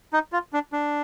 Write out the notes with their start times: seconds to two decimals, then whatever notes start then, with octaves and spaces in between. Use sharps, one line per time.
0.13 D#4
0.33 F4
0.53 D4
0.73 D4